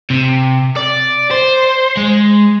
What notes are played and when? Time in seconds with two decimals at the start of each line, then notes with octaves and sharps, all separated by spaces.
0.10 C3
0.76 D5
1.31 C5
1.97 G#3